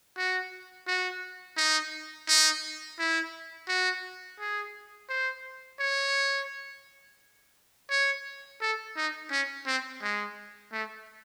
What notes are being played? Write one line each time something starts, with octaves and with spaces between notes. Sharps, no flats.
F#4
F#4
D#4
D#4
E4
F#4
G#4
C5
C#5
C#5
A4
D#4
C#4
C4
G#3
A3